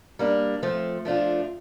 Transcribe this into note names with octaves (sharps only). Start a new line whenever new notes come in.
G3 A#3 D4
F3 A3 C4
F3 A3 D4 F4